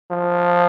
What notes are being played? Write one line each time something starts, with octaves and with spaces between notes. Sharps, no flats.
F3